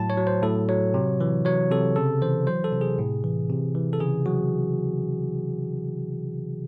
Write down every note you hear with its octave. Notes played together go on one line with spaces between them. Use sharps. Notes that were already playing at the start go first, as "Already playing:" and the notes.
Already playing: A2 F#3 A5
C#5
F#3
C5
A2 A4
F#3 C#5
C3
E3
F#3 C#5
C3 A4
C#3 A4
E3 C5
F#3 C5
A4
C3
G#4
A2
E3
C3
E3
A4
C#3 G#4
F#3 F#4